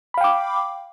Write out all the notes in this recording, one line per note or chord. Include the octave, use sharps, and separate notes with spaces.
F5 G5 B5 D6